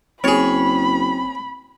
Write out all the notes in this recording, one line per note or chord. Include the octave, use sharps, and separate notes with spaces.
F#1 C4 G#4 C#5 B5